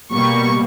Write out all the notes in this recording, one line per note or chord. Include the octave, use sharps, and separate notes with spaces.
B2 G3 A#3 C#6